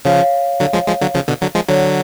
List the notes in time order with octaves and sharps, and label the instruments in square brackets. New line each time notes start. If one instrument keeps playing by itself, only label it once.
[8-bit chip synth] C#3 F3 [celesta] C#5 F5
[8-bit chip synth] D3 F#3
F3 G#3
F3 G#3
D3 F#3
C#3 F3
B2 D3
D3 F#3
F3 G#3
[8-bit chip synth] D3 F#3 [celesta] C#5